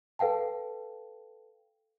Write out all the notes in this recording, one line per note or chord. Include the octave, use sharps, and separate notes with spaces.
A4 B4 F5 G5 A5